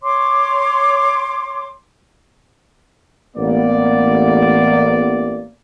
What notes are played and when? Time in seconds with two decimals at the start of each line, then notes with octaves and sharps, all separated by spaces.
0.03 C#5 C6 D6
3.37 A1 A#3 B3 D5